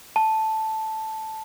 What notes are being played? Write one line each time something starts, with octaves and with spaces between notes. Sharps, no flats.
A5